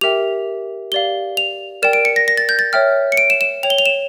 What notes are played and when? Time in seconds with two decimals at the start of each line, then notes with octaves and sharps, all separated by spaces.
0.01 G4 A#4 E5 G5 F7
0.92 G4 D5 F5 G7
1.37 F7
1.82 A#4 D5 G5 E7
1.93 D7
2.05 C#7
2.16 A#6
2.28 A#6
2.37 A6
2.49 G6
2.59 A6
2.73 C#5 E5 G5 F6
3.12 C#7
3.17 D7
3.30 E7
3.41 E7
3.63 C#5 G5 F7
3.70 G7
3.78 F7
3.86 E7